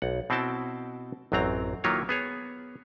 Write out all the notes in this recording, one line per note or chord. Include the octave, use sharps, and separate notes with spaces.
B1 F#5
B2 C4 E4 F#4 G5 A5
A1 F#2 F#3 C4 A#5
D#3 F#3 A#3 E4 F4 C#5
B3 G#4 C#5